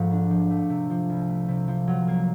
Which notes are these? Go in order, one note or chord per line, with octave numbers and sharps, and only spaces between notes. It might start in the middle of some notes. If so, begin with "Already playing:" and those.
Already playing: G#2 F3 A3
D4
F3
A3
C3
F3
C2
A3
C3
F3
F#3
A#3